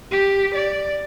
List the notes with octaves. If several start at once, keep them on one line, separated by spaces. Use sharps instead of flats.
G4
D5